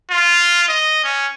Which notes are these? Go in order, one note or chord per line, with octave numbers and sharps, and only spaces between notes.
F4
D#5
C#4